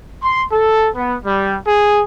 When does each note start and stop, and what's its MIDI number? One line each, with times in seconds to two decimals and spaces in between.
0.23 0.43 84
0.52 0.88 69
0.96 1.14 59
1.25 1.56 55
1.66 2.02 68